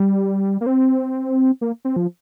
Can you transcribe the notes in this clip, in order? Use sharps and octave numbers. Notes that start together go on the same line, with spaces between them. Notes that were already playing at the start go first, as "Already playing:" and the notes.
Already playing: G3
A#3
C4
A#3
C4
F3